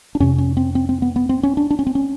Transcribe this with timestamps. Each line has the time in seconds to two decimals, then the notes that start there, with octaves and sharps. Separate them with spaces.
0.15 D4
0.20 F2 C3 C#4
0.38 C#4
0.57 C4
0.75 C4
0.89 C4
1.02 B3
1.16 B3
1.29 C4
1.43 C#4
1.57 D4
1.70 D4
1.79 C#4
1.87 C4
1.95 C#4